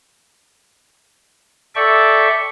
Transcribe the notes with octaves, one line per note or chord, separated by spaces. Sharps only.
A4 D5 E5 G5 C#6